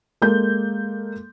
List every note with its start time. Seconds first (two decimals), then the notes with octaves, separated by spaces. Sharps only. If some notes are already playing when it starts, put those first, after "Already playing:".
0.22 G#3 A#3 A4 G6